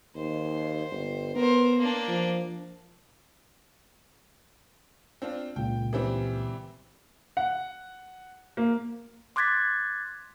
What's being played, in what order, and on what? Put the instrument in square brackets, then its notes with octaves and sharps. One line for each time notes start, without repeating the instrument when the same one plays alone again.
[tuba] D#2 [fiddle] C5
[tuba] G1
[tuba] B3 [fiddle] A#4 C5
[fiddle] A#3 D4
[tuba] F3
[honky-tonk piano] C4 D4 F4
[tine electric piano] C#2 A#2 [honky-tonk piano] G5
[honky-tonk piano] E3 G3 C4
[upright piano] F#5
A#3
[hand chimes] C6 D6 F#6 G#6 A6 B6